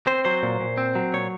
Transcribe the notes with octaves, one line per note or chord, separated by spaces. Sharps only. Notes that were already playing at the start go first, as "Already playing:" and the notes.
C4 C5
F#3 C5
A#2
A#2
C4
F#3
A#2 C#5